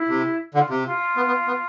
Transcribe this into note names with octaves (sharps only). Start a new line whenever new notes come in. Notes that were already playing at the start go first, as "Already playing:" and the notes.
Already playing: E4
C3
D3 F4
C3
F4
B3
B3
B3